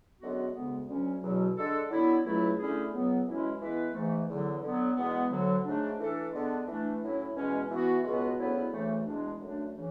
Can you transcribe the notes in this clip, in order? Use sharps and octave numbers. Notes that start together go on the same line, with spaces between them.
F#2 D3 G#3 B3 F#4
D2 C#3 G#3 B3
D2 D3 F#3 C#4
E2 B2 F#3
D3 G#3 D4 A4
D3 F#3 B3 E4
C#2 B2 F#3 A3 E4
D3 A3 C#4 E4 G#4
C#2 C#3 F#3 B3
F#2 E3 G#3 C#4 E4
E3 G#3 B3 E4 B4
G#2 E3 A3
E2 D3 F#3
D3 F#3 B3
E2 B2 G#3 B3
D2 D3 F#3
G#2 F#3 A3 D4
E3 A3 D4 A4
D3 G#3 B3 D4
E3 A3 D4
A2 F#3 C#4 E4
E2 B2 G#3 C#4
E3 B3 F#4
C#2 B2 G#3 B3 F#4
D2 C#3 F#3 B3 E4
D2 C#3 E3 A3
E2 B2 G#3 D4
F#2 D3 A3 D4
C#3 E3